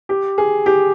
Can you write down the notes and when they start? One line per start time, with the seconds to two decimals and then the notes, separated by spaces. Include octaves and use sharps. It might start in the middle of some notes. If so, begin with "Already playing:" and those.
0.09 G4
0.38 G#4
0.66 G4